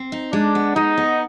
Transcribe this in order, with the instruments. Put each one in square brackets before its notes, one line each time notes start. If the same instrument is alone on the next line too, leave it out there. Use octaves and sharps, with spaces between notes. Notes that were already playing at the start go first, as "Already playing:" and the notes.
Already playing: [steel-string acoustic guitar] C4
D#4
[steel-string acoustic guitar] G#3 [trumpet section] D4
[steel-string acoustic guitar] B3
[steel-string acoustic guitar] G#3 [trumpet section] D#4
[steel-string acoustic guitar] B3